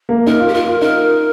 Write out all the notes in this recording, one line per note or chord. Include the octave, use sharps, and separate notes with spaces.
A#3
D#4 A#4
F4
G4
F4 A#4
F4
D#4 A#4